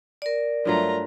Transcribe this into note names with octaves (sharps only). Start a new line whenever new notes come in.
A#4 D5
G2 F#3 A3 F4 A#5